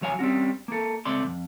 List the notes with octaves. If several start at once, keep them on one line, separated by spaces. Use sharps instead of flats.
D2 F#3 C#5 F5 G#5
G3 C4 C#4 F#4
A#3 A4
C#2 A3 C4 D5 C6
B1 F2